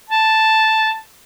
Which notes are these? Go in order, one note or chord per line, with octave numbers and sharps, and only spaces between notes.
A5